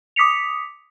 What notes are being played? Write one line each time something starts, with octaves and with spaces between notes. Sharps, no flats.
D6 D#6 B6 C#7 F7